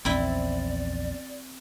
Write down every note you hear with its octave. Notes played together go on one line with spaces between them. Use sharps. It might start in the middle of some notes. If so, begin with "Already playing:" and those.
A#1 E2 C4 C#4 E4 D5